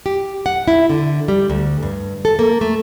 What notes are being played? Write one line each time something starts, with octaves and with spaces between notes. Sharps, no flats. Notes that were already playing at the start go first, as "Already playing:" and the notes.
G4
F#5
E4
D3
G3
D2
G2
A4
A#3
A3